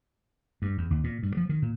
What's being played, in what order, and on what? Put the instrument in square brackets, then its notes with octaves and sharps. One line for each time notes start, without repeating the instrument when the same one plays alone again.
[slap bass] G2
E2
D#2
A#2
G2
F3
D#3
A#2